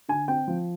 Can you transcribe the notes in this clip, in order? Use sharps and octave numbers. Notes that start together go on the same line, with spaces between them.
D3 G#5
C4 G5
F3